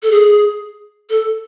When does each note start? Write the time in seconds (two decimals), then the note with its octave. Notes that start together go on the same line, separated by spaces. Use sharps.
0.03 A4
0.11 G#4
1.10 A4